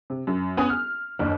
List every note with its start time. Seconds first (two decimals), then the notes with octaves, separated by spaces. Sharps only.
0.10 C3
0.27 F#2
0.57 B3 C#4 G#5 D#6
0.70 F6
1.19 F#1 D#2 D4